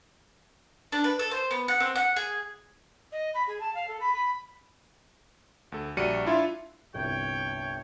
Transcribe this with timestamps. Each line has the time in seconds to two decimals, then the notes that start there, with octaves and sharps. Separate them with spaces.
0.92 D4
1.04 B4
1.19 A4
1.31 C5
1.51 B3
1.68 F#5
1.80 C4
1.95 F#5
2.16 G#4
3.11 D#5
3.34 B5
3.47 G#4
3.59 A5
3.74 F5
3.87 A4
4.00 B5
4.13 B5
5.72 D2 A4
5.97 A#1 G3 F#4 D5 C#7 D#7
6.26 D4 E4 F4 E5 F5
6.94 G1 C2 C#5 G5